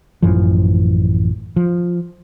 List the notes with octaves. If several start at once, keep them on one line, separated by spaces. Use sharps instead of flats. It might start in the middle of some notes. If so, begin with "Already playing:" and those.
A1 F#2 E3 F3
F3